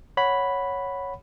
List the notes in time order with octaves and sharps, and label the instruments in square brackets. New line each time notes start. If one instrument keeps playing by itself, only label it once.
[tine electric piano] C#5 F#5 B5